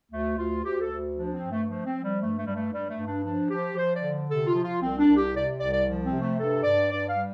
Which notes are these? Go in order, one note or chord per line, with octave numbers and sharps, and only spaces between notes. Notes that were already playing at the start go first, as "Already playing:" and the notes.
D2 A3
D2 F4
D2 G4
A4
D2
F3 D4
C4
G2
A3
F3 A3
C4
F3
G3
G2 A3
A3
G2 G3
A3
G2 G3
A3
G2
D4
F3 D4
F3 G4
F3 C5
D5
D3
C3 A4
F4
F3
F4
C2 C4
D4
C2
G4
C3 D5
C2 D5
D5
F3
C4
C3
A3
G2 A4
G2 D5
G2 D5
F5
G3